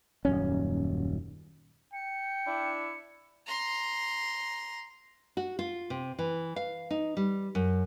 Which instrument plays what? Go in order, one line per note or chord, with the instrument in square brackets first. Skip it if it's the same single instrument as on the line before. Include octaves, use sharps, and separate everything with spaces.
[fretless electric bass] D#1 F#2 C#4
[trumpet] G5 [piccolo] C#7
[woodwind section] D4 E4
[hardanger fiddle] A#5 C6
[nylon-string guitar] F#4
F4
C3
E3
F5
D#4
G3
F#2